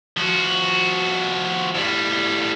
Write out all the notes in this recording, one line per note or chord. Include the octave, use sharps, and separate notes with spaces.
F3 F#4
A2 G3